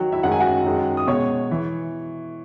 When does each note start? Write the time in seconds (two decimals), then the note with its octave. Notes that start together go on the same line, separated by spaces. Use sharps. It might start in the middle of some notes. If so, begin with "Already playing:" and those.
Already playing: D#3 F#3 F#4
0.12 E4 E5
0.23 F#2 D#3 G#3 F#5
0.32 G#5
0.40 F#4 F#5
0.65 F#2 D#3 G#3
0.97 D#6
1.07 B2 G#3 C#5 C#6
1.51 E3